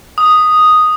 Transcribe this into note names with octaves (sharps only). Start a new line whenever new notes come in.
D#6